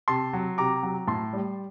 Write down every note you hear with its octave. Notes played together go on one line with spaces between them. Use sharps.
C3 A5 C6
F#3
C3 A#5 D6
F#3
A2 A5 C6
G3